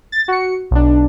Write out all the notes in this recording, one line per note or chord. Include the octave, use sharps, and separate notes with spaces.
A6
F#4 C#7
B1 D4